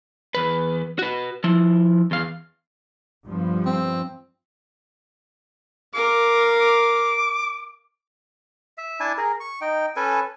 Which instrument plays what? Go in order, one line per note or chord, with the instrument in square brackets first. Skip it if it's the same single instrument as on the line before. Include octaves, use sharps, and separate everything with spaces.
[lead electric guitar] E2 B4
F#4 B4
F3 E4
E2 F5
[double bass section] G2 F3 B3
[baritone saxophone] C4
[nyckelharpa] A#4 F5 [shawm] D6
[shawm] D6
[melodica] E5
D4 E4 G#5 A5
G#4 A#4
C#6
D#4 G5
C#4 A4 B4 G#5